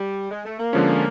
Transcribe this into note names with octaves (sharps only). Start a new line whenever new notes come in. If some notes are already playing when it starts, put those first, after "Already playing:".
Already playing: G3
G#3
A3
A#3
D3 F3 G#3 C#4